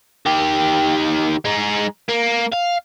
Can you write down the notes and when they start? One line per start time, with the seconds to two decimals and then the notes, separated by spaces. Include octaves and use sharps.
0.26 D#3 G4
1.45 G#3 D#4
2.09 A#3
2.53 F5